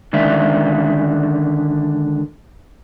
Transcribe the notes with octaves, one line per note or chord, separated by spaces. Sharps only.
D3 D#3 G#3 C#4 D5 E5